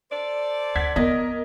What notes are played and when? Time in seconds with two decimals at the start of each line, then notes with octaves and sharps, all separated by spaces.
0.11 A4 C5 D5
0.75 D2 F#5 G#6 B6
0.96 B3 A#4 D#5